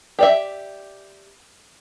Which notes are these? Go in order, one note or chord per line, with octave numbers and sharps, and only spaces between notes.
G4 D5 E5